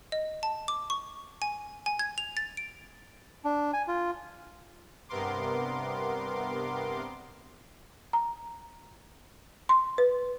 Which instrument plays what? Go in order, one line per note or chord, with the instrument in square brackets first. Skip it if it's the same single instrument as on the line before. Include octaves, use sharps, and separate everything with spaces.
[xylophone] D#5
A5
D6
C#6
G#5
G#5
G#6
F7
A6
D7
[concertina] D4
G#5
F4
[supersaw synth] G2 C3 B3 A#4 C6 D6
[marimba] A#5
C6
B4